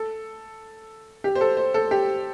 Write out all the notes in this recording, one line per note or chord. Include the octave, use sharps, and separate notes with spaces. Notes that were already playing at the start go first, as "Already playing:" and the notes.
Already playing: A4
G4
C5
A4
C5
A4
G4